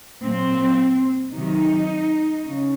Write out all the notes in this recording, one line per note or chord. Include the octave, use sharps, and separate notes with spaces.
A#2 F#3 C4
C3 D#3 F#3 D#4
C#3